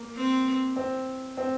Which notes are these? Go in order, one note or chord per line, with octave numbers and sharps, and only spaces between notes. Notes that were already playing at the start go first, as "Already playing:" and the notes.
Already playing: A#3
C4
C4
C4